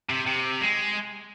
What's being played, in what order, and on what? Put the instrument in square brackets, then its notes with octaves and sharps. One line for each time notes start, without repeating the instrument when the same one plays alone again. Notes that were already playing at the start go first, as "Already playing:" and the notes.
[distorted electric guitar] C3
C3
G#3